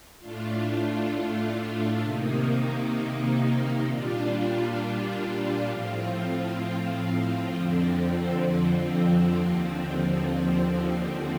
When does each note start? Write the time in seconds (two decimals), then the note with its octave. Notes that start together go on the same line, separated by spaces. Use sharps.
0.19 A2 A3 D4 F4
2.02 C3 D#3 A#3 D#4
3.85 A#2 G3 D4 F4
5.69 A2 F3 C4 F4
7.53 F2 D3 F3 C4
9.35 D#2 D3 F3 C4